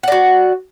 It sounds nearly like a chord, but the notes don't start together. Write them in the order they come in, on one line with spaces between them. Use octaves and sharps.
F#5 D5 F#4